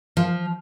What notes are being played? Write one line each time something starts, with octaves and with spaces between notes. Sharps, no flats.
F3